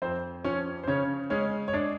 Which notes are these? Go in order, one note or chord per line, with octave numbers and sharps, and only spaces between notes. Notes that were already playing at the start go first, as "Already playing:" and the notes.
F2 C4 C5
F3 C#4 C#5
C5
C#3 C#4 C#5
G#3 C#4 C#5
C#5
D4 D5